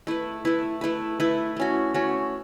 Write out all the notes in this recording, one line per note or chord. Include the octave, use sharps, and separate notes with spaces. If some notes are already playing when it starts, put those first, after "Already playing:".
A3 E4 B4
A3 E4 B4
A3 E4 B4
A3 E4 B4
A3 C#4 F#4
A3 C#4 F#4